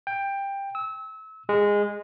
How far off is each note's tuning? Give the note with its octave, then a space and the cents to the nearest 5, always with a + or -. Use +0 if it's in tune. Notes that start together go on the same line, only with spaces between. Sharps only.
G5 +15
E6 -30
G#3 -15